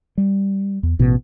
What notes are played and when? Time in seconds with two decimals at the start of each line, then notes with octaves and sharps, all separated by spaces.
0.18 G3
0.83 E2
0.99 A1 B2